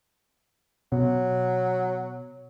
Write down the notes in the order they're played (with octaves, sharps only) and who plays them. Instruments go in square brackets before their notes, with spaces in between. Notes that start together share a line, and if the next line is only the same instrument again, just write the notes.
[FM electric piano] B2 [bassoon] F#3